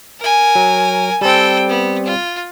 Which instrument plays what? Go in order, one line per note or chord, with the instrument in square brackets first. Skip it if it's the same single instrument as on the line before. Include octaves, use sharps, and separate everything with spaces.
[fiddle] A#4 G#5
[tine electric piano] F#3
[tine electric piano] G3 C4 [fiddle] A4 G5
[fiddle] B3
F4